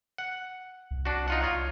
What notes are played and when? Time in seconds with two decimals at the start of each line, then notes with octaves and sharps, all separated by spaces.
0.18 F#5
0.91 C2
1.05 D4 F#4
1.28 D#4 F4 F#5
1.43 F4 C#5